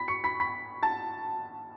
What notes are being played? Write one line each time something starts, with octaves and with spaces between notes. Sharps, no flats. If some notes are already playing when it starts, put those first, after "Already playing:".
Already playing: B5 B6
C#6 C#7
B5 B6
B5 B6
A5 A6